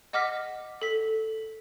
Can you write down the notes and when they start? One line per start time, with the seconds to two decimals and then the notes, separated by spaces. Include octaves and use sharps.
0.13 D#5 F#5 D6 F6 A#6 B6
0.82 A4 B6